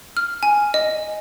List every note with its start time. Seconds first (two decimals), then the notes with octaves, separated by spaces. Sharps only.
0.17 F6
0.43 G#5
0.74 D#5